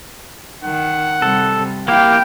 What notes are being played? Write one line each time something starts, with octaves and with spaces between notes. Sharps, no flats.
D#3 F#5
C3 G3 A4
A#3 E4 G4 F5 G5